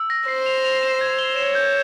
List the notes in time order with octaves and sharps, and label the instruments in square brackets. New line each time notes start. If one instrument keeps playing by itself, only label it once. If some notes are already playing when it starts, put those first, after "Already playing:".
Already playing: [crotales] E6
A#6
[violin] C5 [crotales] C7
[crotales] F7
F7
E7
G#6
G7
[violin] C#5 [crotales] E7
[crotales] G6